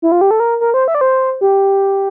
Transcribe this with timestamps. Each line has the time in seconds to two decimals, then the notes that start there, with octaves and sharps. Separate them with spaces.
0.02 E4
0.12 F4
0.21 G4
0.31 A4
0.40 A#4
0.61 A#4
0.74 C5
0.88 E5
0.95 D5
1.01 C5
1.41 G4